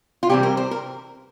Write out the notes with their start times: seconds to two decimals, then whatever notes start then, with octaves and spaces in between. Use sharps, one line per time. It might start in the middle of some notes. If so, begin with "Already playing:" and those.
0.23 F4
0.29 C3 E3 G3 C4 G4
0.43 A#4
0.57 C5
0.71 A#4